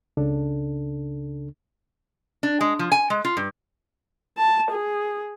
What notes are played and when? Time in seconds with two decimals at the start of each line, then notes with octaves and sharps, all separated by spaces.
0.17 C#2 C#3 D4 A4
2.43 D4
2.61 G#3
2.79 F3
2.92 G#5
3.10 G#3
3.25 F4
3.37 G2
4.37 A5
4.72 G#4